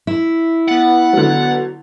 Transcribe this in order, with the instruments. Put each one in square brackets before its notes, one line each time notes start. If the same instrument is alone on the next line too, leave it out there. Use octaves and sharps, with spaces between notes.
[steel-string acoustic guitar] E4
[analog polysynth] B3 A6 [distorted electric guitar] F#5
[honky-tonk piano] D3 F#3